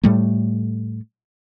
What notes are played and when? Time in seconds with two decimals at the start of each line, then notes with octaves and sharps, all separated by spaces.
0.04 A2 G3 A3